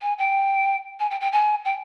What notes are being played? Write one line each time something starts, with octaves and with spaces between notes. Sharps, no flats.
G#5
G5
G#5
G5
G5
G#5
G5